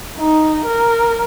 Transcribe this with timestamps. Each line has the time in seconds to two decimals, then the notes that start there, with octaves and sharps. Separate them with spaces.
0.18 D#4
0.65 A#4